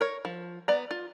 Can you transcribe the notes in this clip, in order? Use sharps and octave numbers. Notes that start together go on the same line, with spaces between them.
A#4 C#5
F3
B3 D5 A#5
F4